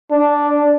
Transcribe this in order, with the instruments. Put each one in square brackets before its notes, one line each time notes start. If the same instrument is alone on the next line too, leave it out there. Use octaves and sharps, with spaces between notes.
[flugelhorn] D4